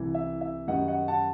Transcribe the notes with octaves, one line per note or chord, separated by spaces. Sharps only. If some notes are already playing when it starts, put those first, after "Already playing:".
Already playing: C2 C3 E3
E5
E5
F#2 D#3 G3 D#5 F#5
D#5 F#5
F#5 A5